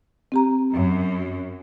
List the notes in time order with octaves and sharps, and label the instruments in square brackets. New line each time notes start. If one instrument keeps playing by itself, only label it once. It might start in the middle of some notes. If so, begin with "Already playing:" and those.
[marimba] C4 G4 A#5
[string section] F#2